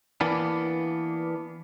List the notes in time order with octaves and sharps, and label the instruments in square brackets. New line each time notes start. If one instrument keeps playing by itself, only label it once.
[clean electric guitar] E3 A#3 B3 D4